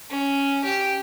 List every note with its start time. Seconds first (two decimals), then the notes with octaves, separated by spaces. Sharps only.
0.10 C#4
0.64 G4